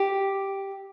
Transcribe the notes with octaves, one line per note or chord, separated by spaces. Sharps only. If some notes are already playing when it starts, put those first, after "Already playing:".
Already playing: G4